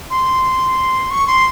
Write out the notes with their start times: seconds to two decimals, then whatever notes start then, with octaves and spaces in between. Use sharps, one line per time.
0.10 C6
1.11 C#6
1.27 C6